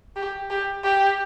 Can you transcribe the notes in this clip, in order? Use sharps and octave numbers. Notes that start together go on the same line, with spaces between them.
G4
G4
G4